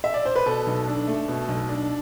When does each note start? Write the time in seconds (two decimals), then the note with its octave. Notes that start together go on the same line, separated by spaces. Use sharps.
0.04 E5
0.14 D5
0.25 C5
0.36 B4
0.46 B2 A4
0.67 B1
0.87 D4
1.07 A3
1.28 B2
1.48 B1
1.69 D4